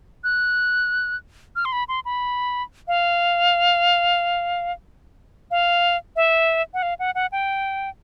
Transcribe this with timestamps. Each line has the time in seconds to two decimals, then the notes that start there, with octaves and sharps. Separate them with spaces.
0.24 F#6
1.56 F6
1.65 C6
1.72 B5
1.88 C6
2.05 B5
2.88 F5
5.51 F5
6.16 E5
6.74 F#5
6.82 F5
6.99 F#5
7.15 F#5
7.32 G5